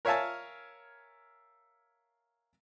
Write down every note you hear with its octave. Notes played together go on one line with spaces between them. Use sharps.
A#4 C#5 E5 F5 G#5 A5